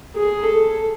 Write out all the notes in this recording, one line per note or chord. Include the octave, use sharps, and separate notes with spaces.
G#4
A4